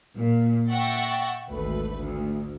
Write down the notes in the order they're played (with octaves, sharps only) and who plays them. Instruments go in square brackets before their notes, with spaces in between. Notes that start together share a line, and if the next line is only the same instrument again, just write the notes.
[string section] A#2
E5 F#5 G5 C#6 A6 A#6
G#1 D2 A3 B4
D2